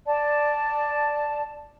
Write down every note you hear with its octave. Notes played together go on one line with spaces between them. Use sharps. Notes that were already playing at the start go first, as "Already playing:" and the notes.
D5 A5